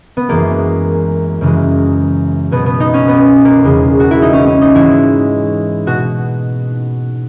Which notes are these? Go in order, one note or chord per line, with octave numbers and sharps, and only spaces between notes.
B3
F#2 E3 G#3 A#3
F#2 C#3 E3 G#3
B2 F#3 B3
B3
D#4
C#4
B3
A#3
E2 C#3 G#3
F#4
E4
D#4
C#4
C#4
D#4
G#2 E3 G#3 E4
B2 F#4